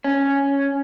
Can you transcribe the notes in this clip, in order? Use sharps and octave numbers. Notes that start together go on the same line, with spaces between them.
C#4